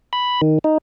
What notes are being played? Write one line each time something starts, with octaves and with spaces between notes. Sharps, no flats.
B5
D#3
D#4